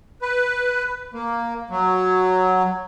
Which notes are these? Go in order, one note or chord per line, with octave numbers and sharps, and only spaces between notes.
B4
A#3
F#3